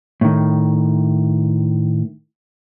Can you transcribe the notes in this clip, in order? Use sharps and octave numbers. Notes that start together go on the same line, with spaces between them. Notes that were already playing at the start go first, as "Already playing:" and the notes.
A2 D#3